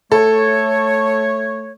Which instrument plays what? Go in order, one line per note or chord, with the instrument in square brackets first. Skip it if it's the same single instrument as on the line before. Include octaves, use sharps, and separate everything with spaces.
[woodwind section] A3 C#5 [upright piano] A4